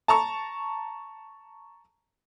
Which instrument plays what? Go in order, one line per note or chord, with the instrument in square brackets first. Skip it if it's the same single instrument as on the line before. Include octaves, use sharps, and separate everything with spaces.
[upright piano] A5 A#5 C#6